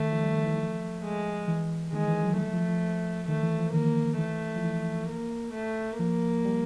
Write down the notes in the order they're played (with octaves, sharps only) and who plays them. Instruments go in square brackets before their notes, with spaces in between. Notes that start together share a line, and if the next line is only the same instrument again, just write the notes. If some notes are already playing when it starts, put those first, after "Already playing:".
Already playing: [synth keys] D#3 [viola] A3
[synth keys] F3
G3
D#3
E3
F3
[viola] G#3
[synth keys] E3
[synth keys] D#3 [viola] G#3
[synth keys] E3
F#3
[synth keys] G3 [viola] A3
[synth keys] F3
F3
[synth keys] D#3 [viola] A3
[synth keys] E3
F3
[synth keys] D#3 [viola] A#3
[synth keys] E3 [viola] A3
[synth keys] F3
E3
[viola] A#3
A3
[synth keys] F3 [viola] A#3
[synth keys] G3